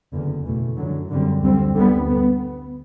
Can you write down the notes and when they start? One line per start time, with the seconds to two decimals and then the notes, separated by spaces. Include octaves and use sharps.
0.12 F#1 E2 D3
0.45 E2 B2 A3
0.77 F#2 D3 F#3
1.09 F#2 D3 G3 C4
1.41 D2 D3 G3 C4
1.74 D2 D3 G3 B3
2.07 B3